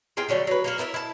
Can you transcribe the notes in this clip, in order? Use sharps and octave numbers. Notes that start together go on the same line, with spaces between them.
F4 G#4 A#4 G5
D3 F#3 G3 A3
F#3 B4
A#3 F#4 A#4
E4 A#4 B4 E5
E4 A5